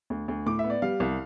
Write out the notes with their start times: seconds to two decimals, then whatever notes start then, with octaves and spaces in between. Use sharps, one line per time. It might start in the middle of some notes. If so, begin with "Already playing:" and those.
0.10 D2
0.28 D2
0.46 A2 D6
0.59 E5
0.64 B3
0.70 D5
0.82 G3 F5
1.00 C2